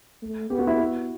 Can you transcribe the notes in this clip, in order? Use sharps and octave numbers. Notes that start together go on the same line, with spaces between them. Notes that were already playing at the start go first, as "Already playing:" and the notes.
A3
B3 G4
F#4
E4
B3 F#4